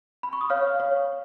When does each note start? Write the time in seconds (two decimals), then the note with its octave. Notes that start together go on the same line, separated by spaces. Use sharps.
0.23 B5
0.33 C#6
0.41 D#6
0.50 C#5 F5 F6
0.80 C#5